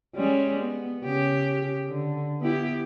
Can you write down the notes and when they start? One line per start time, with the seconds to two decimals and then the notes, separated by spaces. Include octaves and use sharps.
0.15 G3 G#3 C#4
0.60 B3
1.03 C#3 G4
1.88 D3
2.41 B3 E4 G4